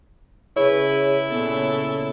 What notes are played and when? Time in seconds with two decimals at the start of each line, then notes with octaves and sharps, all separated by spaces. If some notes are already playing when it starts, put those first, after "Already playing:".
0.56 C#3 E4 G#4 B4 C#5
1.30 A#2 C#3 B3 A4